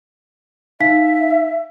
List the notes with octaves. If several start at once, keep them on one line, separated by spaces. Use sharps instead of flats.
D#4 E5 F5 B6